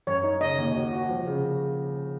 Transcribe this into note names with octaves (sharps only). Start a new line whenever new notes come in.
F#2 C#5
D#4
C#3 D#5
D#2
F#4
F#4
F3
C#3